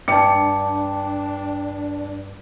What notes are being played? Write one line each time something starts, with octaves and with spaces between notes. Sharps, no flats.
G2 D4 G5 A5 D6 C#7